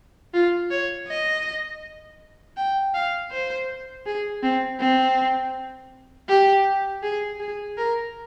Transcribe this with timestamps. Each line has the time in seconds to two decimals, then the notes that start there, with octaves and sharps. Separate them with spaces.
0.34 F4
0.71 C#5
1.08 D#5
2.57 G5
2.94 F5
3.31 C5
4.06 G#4
4.43 C4
4.80 C4
6.29 G4
7.03 G#4
7.40 G#4
7.78 A#4